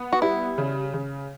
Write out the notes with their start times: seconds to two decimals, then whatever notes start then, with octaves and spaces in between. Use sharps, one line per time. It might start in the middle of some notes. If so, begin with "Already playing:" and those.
Already playing: B3
0.13 F#4
0.22 G3 E4
0.58 C#3
0.93 C#3